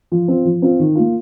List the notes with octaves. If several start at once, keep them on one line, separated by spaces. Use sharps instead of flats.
F3
C4 F4
F3
C4 F4
D#3
A#3 F4